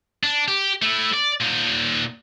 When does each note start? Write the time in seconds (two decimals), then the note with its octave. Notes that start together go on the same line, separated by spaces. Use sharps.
0.23 D4
0.48 G4
0.83 A3 E4
1.14 D5
1.41 A#2 D#4